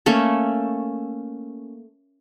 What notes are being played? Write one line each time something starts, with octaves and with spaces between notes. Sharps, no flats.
A3 A#3 C#4 A4